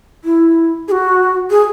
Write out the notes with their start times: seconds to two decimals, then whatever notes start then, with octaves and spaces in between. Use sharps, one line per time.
0.24 E4
0.88 G#4
0.92 F#4
1.50 G#4